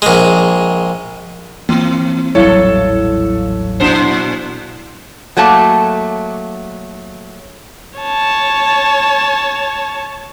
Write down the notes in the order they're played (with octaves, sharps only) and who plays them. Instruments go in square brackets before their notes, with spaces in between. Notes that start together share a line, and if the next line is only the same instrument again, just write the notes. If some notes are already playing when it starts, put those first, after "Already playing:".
[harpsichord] A#1 G#3
[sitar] E3 [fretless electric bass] A#3 C4
[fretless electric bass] D#1 A1 G3 [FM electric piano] F#3 E4 F5 [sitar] A4 [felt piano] C#5
[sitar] A#2 D4 C5
[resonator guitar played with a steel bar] F#3 A3 A#3 A5
[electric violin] C#5 A5